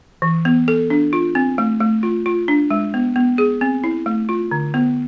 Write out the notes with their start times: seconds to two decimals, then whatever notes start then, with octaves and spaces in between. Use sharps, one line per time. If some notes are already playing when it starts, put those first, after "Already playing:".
0.22 E3
0.45 B3
0.68 A4
0.90 D4
1.13 F4
1.35 C4
1.58 A3
1.80 A3
2.03 F4
2.26 F4
2.48 D4
2.71 G#3
2.94 B3
3.16 B3
3.38 G#4
3.61 C4
3.84 E4
4.06 A3
4.29 F4
4.51 D3
4.74 B3